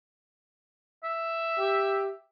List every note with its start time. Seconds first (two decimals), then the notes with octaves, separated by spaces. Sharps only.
1.04 E5
1.58 G4